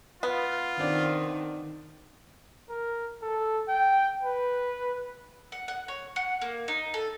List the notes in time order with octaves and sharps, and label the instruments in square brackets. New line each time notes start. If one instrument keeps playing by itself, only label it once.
[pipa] B3 [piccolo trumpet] F4
[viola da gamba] D#3 [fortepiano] C4 D4
[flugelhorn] A#4
A4
G5
B4
[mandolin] F#5
F#5
C#5
F#5
A#3
D#4
A4